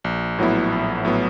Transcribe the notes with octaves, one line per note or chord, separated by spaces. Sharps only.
A#1
A2 F#3 B3 E4
A#1
A2 F#3 B3 E4